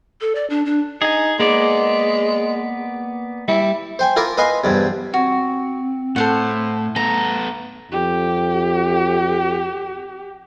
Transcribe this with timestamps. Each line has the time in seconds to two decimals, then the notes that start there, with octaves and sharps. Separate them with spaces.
0.21 A4
0.35 D5
0.50 D4
0.65 D4
1.02 D#4 G#4 G#5
1.40 G#3 A#3 B3 D5
3.48 G3 E4
3.99 C5 G5 G#5
4.16 E4 F4 A#4 A5 D6
4.37 B4 D#5 F5 G#5 C6
4.64 E2 G2 C3
5.14 C4 F#4
6.16 A2 A4 C5 F#5
6.49 A3
6.96 B3 A4 A#5
7.92 F2 G4